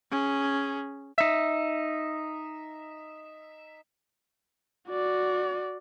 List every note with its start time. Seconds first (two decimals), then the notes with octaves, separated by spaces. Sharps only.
0.11 C#4 G#4
1.18 D#4 E5
4.89 F#4 D5